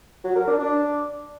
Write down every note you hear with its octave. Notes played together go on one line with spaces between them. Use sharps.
F#3
A#4
D4
D4